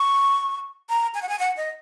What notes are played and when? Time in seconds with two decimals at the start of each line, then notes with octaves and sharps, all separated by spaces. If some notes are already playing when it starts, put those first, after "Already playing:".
Already playing: C#6
0.89 A#5
1.15 G#5
1.22 F#5
1.29 G#5
1.40 F#5
1.57 D#5